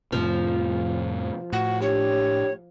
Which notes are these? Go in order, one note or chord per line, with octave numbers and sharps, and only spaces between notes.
F2 A2 C3 F3
A2 F#4
D4 G4 C#5